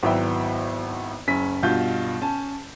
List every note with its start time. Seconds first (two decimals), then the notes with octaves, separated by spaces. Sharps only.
0.03 G#1 F#3 B3 E4 E5 G5
1.27 F#1 C#4 B6
1.63 G2 B2 F4 G6
2.22 C#4 A5